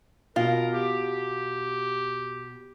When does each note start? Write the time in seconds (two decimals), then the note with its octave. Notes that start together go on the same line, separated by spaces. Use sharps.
0.36 B2 F4 A#4
0.73 G4